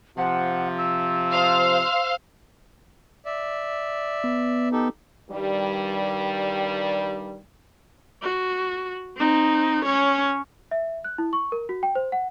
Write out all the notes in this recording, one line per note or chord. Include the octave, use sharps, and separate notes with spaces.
C3 F3 F#5
E6
C5 F5
D5 E5
B3
D#4 G4 A4
G2 D#3 G3
F#4
C4 D#4
C#4 C#5
E5
F#6
E4
C#6
A#4
F#4
G5
C5
F#5